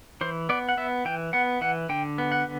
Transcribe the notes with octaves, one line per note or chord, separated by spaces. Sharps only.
E3 C5
B3 D5
F#5
B3 E5
E3 G5
B3 F#5
E3 F#5
D3 G5
B3
F#5